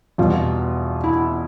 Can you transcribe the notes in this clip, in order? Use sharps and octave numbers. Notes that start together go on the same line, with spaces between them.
E2 B2 G3 F4
E4